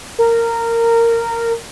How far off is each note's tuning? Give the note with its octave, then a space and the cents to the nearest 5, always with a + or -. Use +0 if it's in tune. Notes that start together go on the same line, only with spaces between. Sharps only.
A#4 -15